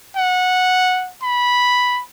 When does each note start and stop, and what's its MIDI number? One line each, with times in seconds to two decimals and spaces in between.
0.16 1.10 78
1.23 2.01 83